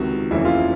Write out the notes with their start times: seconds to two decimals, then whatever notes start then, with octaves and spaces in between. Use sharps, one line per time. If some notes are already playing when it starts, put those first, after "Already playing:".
Already playing: C#2 C3 D#3 F#4
0.31 F1 D#2 C#3 E3 E4
0.45 F4